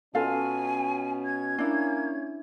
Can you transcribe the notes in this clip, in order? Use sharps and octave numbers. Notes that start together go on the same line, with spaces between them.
B2 C#4 F4 A4 F5 G#5
G#6
A#3 D4 E4